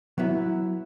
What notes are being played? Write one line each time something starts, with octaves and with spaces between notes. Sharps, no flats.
F#3 B3 E4 E5